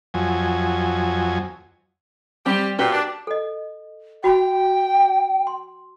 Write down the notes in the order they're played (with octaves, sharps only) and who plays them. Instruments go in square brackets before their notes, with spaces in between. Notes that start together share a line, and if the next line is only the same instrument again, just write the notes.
[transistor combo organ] F2 F#3 G#5
[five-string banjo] G3 C4 [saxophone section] G4
[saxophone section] A#2 [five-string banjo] F#4 G4 B4
[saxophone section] D4
[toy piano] A4 D#5
[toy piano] F#4 B5 [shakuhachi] G5
[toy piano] C6